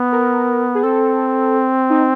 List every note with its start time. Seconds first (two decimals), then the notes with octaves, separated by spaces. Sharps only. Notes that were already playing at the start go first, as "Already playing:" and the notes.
Already playing: B3
0.12 A#4
0.75 G#4
0.83 C4 A4
1.90 D#4